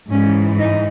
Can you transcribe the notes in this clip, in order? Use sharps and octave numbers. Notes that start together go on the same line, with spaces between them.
G#2 E3 C#4
D#4